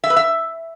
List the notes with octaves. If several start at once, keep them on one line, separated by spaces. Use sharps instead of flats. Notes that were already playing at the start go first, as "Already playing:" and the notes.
E5
B4
E5